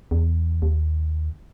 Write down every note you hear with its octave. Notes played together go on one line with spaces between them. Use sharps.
E2
D#2